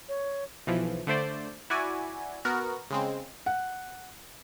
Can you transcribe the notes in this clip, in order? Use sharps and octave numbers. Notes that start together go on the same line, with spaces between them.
C#5
B1 E3 F3
D3 A3 C5 D5
E4 F#4 D5 G#5
B3 F#4 A#4
C#3 G#3 C4
F#5